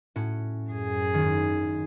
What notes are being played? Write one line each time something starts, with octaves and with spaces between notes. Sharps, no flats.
A2 C#4 F#4
F#2 G#4
G#1 D#3